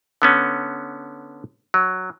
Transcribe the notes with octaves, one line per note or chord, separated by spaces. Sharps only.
D3 B3 C#4
F#3